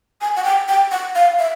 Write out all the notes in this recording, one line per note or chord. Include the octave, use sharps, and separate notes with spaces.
G#5
F#5
G5
G5
F#5
F5
E5